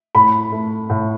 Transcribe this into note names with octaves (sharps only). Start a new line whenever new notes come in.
A2 B5
A3
A2